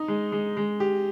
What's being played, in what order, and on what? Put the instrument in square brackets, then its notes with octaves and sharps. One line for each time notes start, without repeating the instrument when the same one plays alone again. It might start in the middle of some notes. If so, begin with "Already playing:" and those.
Already playing: [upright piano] D#4
G#3
G#3
G#3
G4